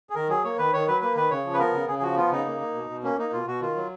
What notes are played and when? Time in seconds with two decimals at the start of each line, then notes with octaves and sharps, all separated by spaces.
0.10 G#4
0.15 D#3 A#4
0.29 F#3 G#4
0.44 A#3 C#5
0.58 D#3 B4
0.73 D#3 C#5
0.88 F#3 B4
1.01 A#3 B4
1.16 D#3 B4
1.30 C#3 C#5
1.45 F3
1.54 B4
1.59 B3 A#4
1.74 C#3
1.88 C#3 G#4
1.99 G#4
2.02 F3 F#4
2.17 B3 F4
2.32 C#3 D#4
2.46 A#3
2.61 A#3
2.74 B2
2.90 B2
3.03 A#3 C#4
3.18 A#3 D#4
3.33 B2 F4
3.47 B2 F#4
3.61 D#3 F4
3.76 F#3